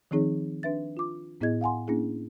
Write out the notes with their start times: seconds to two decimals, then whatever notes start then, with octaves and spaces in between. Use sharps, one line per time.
0.11 D#3 F3 C4 D#4 G#4 C#5
0.63 D4 B4 E5 A6
0.97 F4 D6
1.41 A2 B3 E4 G#4 D#5 G#6
1.61 F5 F#5 G#5 C6
1.88 A#3 C#4 D4 E4 G#4